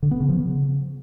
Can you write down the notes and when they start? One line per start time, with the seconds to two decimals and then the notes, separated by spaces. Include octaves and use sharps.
0.03 D3
0.11 B3
0.20 C#3
0.29 F3
0.38 C#3